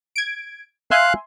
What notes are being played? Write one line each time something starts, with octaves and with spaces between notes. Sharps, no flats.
G#6 D7
E5 F5 G#5 C6 F#6